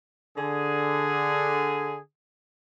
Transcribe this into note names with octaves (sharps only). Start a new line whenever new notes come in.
D3 G#4